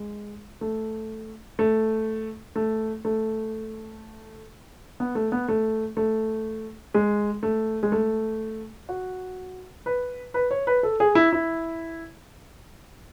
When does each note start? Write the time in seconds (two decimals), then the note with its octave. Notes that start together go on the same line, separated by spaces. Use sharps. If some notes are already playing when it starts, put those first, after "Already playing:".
Already playing: G#3
0.61 A3
1.59 A3
2.56 A3
3.05 A3
5.00 B3
5.15 A3
5.32 B3
5.48 A3
5.97 A3
6.94 G#3
7.43 A3
7.83 G#3
7.92 A3
8.89 F#4
9.86 B4
10.34 B4
10.51 C#5
10.67 B4
10.83 A4
11.00 G#4
11.15 E4
11.33 E4